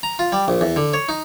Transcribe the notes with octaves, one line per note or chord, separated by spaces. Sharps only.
A#5
F4
G3
A#1
E2
D3
C#5
D#4